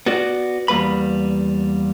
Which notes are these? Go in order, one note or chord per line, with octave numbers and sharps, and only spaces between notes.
B3 F#4 D5
E2 G3 A#3 B4 B5